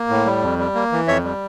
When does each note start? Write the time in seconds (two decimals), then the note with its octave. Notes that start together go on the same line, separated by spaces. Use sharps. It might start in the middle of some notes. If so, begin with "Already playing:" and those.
Already playing: A#3
0.09 A2
0.26 G3
0.42 F2
0.59 G3
0.75 A#3
0.92 E3
1.08 F2 C#5 E5
1.24 G3